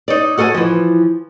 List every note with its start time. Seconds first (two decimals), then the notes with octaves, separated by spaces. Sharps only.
0.08 D#4 C#5 D5
0.38 F#4 A4 D#5 F5 G#5
0.54 E3 F3